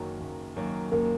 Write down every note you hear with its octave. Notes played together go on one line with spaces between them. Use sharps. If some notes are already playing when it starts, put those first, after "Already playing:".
Already playing: F#1 F#2 D#3 F#3 A#3
F#1
F#2 D#3 F#3 A#3
F#1 A#3